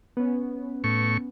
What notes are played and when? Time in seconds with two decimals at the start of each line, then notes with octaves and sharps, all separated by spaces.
0.17 B3 C#4
0.84 A2 C#6